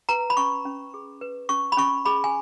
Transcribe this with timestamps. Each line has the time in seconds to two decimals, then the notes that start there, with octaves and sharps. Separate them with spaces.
0.09 B4 A#5
0.30 B5
0.37 C#4 C#6
0.65 C#4
0.94 G#4
1.21 B4
1.49 C#4 C#6
1.72 B5
1.77 C#4 C#6
2.05 G#4 B5
2.24 G#5